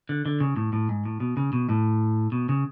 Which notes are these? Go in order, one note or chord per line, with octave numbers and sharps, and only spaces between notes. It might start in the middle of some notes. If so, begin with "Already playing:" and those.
D3
D3
C#3
A2
A2
G#2
A2
B2
C#3
B2
A2
B2
C#3